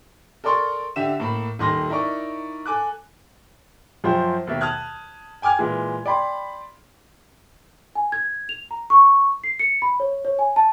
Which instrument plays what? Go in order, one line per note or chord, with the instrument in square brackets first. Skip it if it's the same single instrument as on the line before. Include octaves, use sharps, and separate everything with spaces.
[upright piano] A4 A#4 D5 C6 C#6
D3 G4 E5 E7
A2 A#3 B5
D#1 D#3 C6 A#6
D#4 E4 A#4 D5 C#6
A4 G#5 D6 F#6
[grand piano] F#2 F3 C5 G5
D#2 B2 E5
A5 D#6 F6 F#6 G#6
G5 G#5 D6 F6 G#6
A#2 E3 G#3
D5 G5 B5 C6
[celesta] G#5
G#6
F7
A#5
C#6
C7
C#7
B5
C#5
C#5
G#5
A5